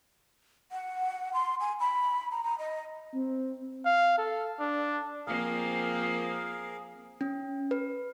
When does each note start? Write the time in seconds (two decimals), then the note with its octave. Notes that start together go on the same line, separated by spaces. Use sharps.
0.72 F#5
1.33 C6
1.60 G#5
1.80 B5
2.31 A#5
2.44 A#5
2.58 D#5
3.14 C4
3.86 F5
4.19 A4
4.60 D4
5.27 F3 A#3 C4 G#4 A#4 F5
7.21 C#4
7.71 B4